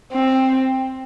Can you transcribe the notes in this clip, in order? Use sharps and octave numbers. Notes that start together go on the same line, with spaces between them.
C4